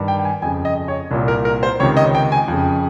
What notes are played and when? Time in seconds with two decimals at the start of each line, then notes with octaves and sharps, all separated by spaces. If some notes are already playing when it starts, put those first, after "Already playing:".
Already playing: G2 D#3
0.08 G5
0.19 G5
0.25 G#5
0.42 F2 C#3 G#5
0.65 D#5
0.88 C#5
1.11 C2 A#2
1.28 A#4
1.45 A#4
1.63 C5
1.80 C#2 C3 D#3 C#5
1.97 D#5
2.15 G5
2.32 G#5
2.48 F2 C#3